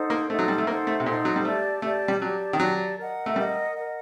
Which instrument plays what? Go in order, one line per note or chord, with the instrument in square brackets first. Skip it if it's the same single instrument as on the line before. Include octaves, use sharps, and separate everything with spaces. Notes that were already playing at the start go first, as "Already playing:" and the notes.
Already playing: [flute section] D#4 A4 C5 F#5
[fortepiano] A#3
[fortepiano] A3 [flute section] D#4 A4 C5 F#5
[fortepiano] F#3
G3
A3
[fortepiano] A#3 [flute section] D#4 A4 C5 F#5
[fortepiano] A3
C3
[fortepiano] A#2 [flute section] D#4 A4 C5 F#5
[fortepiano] F#3
G3
[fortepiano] A3 [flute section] G4 D5 A5
[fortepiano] A3 [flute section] G4 D5 A5
[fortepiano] G3
[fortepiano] F#3 [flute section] G4 D5 A5
[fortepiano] D#3
[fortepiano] F#3 [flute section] G4 D5 A5
[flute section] A#4 D#5 F#5
[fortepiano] A3
[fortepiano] G3 [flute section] A#4 D#5 F#5
[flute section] A#4 D#5 F#5